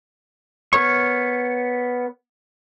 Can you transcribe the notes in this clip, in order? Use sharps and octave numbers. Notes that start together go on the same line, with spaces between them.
B3 A#4 C#5 C#6